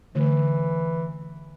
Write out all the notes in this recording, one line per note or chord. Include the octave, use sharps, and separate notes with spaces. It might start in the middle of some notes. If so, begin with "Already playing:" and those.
D3 E3 A3